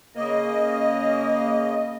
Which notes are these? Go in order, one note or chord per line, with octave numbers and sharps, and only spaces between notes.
C#3 A#3 D#5